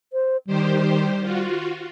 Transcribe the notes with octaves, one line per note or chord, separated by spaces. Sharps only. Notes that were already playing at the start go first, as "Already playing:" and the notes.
C5
D#3 G3 G4 C5
F4 F#4